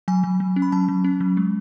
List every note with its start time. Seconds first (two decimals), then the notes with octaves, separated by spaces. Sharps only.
0.08 F#3 G#5
0.24 F#3
0.40 F#3
0.56 C#4
0.62 B5
0.72 F#3 A5
0.88 F#3
1.04 C#4
1.21 F#3
1.37 G#3